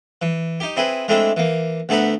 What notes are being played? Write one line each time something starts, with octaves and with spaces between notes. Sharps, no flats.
E3
D#4 G4
C4 E4 G#4 B4
G#3 A3 C4 D4 E4
E3 A#3
D2 A3 B3 F#5 A#5 B5